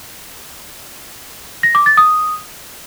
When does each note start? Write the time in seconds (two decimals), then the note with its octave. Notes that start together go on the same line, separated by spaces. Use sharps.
1.63 A#6
1.75 D6
1.86 A6
1.97 D#6